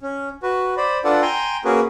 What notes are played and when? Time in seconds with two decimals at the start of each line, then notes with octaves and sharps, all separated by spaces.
0.01 C#4
0.43 F#4 B4
0.77 C5 D5 B5
1.04 D4 F4 A4 B4 D5 F#5
1.22 G5 G#5 A#5 C6
1.65 A#3 C#4 F#4 G#4 A#4 B4